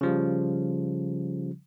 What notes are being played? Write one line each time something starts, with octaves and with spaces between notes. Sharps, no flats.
C#3 F3 G3